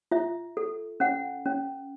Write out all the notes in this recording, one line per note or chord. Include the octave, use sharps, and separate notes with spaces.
F4 E5
A4
C#4 F#5
C#4